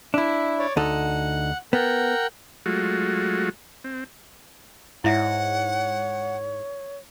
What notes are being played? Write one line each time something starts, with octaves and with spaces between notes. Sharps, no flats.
D4 E4 E5
C#5 D5
D2 D#4 A4 F#5
B3 A#4 F#5 G5
F#3 G#3 A3 F4 F#4
C4
G#2 E4 C#5 D5 E5 F#5